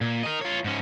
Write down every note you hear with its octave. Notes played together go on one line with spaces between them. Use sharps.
A#2
A#4 D#5
F4 C#5
G#2 C#4